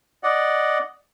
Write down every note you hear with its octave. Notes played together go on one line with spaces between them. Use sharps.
D5 D#5 F#5